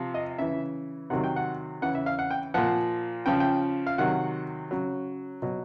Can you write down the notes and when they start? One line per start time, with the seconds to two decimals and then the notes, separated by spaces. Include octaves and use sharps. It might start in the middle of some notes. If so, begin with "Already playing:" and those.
Already playing: C3 F3
0.14 D#5
0.38 C#3 E3 E5
1.10 C3 D#3 F#3 F#5
1.24 G5
1.36 F#5
1.82 C#3 E3 F#5
1.95 E5
2.06 F5
2.19 F#5
2.30 G5
2.54 A#2 F3 F#5
3.26 C#3 F3 G5
3.40 G5
3.87 F5
3.98 C3 D#3 F#3 F#5
4.71 C#3 F#3
5.42 B2 F#3